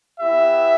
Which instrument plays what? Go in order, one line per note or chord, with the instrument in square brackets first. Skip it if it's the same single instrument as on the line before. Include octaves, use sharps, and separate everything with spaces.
[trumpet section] B3 E4 G4 E5